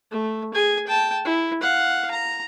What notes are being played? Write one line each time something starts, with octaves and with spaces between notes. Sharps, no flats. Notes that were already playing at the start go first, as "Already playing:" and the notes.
A3
G#4 G#5
G5 A5
E4
F5 F#5
A#5